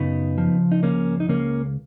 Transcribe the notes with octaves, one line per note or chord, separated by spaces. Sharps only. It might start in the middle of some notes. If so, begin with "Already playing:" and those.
Already playing: F#2 C#3 B3 D#4
F3
D#4
C#2 A#3 C#4
D#4
C#2 A#3 C#4